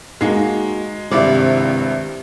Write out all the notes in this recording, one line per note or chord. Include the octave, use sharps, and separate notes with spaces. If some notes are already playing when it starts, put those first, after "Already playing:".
G#3 A#3 D#4 F#4
G#1 G2 C3 E4 D5